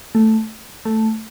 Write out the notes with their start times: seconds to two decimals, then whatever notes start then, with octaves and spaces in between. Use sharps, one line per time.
0.15 A3
0.85 A3